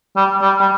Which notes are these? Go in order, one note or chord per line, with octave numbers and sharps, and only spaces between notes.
G3
G3
G3